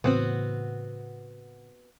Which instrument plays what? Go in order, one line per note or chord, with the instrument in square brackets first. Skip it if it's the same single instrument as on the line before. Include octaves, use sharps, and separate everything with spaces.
[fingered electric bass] A2 C#3 E3 [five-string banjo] B3 C4 F#4